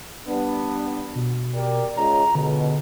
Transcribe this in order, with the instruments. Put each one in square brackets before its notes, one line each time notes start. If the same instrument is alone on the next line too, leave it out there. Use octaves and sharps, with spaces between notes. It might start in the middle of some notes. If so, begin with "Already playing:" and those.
[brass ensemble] G3 B3 D4
[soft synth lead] B2
[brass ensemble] G4 A#4 D5
[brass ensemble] C#2 [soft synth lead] A#5
[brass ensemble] C#2 B2 [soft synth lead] D3